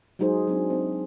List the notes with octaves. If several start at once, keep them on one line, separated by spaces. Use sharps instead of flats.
F#3 G#3 D#4 G#4 C5
F#3 C4 D4
C4 D#4